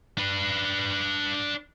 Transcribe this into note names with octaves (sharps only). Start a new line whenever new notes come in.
D4 B4